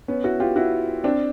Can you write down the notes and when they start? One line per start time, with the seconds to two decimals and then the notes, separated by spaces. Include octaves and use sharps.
0.08 B3 C#4
0.24 E4 F#4
0.40 F4 G4
0.56 E4 F#4
1.04 C4 D4